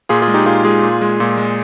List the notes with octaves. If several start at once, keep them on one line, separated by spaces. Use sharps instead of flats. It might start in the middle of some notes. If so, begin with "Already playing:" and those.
A#2 F4 G#4
F4 G#4
G#3
D#4 G4
A#2 F4 G#4
G#3 F4 G#4
A#2
G#3
A#2
G#3